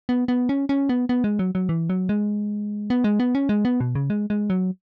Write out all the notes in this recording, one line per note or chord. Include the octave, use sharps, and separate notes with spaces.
B3
B3
C#4
C#4
B3
B3
G#3
F#3
F#3
E3
F#3
G#3
B3
G#3
B3
C#4
G#3
B3
B2
C#3
G#3
G#3
F#3